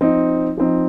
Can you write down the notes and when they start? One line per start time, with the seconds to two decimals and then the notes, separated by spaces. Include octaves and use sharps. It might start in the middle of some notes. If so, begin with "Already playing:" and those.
0.01 F3 C4 D#4
0.57 F3 C4 D#4